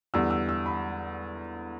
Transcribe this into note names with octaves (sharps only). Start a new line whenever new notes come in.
E2 D3 G3 E6
E6
E6
B5